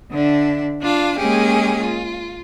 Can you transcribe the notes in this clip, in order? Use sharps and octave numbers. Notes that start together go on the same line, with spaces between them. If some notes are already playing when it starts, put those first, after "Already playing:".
D3 D4 E5
D4 F4 F5
G#3 A#3 C#4 G4 G#4
F4